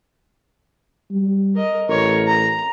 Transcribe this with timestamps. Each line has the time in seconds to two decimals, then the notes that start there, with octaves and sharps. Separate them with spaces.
1.11 G3
1.55 A#4 D#5
1.89 A1 A#4 C#5
2.27 A#5